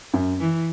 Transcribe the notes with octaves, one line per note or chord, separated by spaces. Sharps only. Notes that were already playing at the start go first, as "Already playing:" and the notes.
F#2
E3